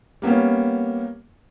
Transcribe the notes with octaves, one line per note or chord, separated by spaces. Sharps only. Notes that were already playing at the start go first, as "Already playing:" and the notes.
G3 A#3 B3 C#4